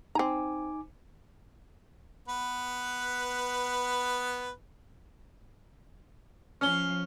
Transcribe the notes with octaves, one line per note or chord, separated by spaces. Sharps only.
C4 D#4 G#5 A#5 D6
B3 B4
F3 C#4 F6 G7